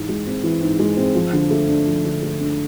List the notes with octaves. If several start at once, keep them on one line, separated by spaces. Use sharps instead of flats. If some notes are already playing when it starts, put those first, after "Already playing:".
Already playing: G#2 E3
G#3
C4
E3
G#2
G#3
C4
F3
D3
A3
D4
F3
D3
A3
D4